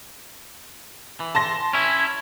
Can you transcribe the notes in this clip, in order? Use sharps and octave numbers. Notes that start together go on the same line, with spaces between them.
E3
A5 C6 A#6
C#4 E4